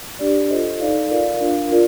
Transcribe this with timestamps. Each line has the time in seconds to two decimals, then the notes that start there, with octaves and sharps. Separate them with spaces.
0.19 D4 G4 D5
0.50 F4 A4 C5 D#5
0.80 D#4 A4 D5 F5
1.10 F4 A#4 D5 F5
1.41 D4 F4 A#4 F5
1.72 F4 A#4 D5